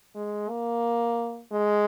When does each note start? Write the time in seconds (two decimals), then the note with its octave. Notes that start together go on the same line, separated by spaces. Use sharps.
0.15 G#3
0.50 A#3
1.52 G#3